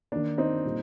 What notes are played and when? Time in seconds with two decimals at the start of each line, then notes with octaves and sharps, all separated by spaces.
0.12 D#3 A#3 D4
0.38 C4 D#4
0.65 A#2 G3 A#3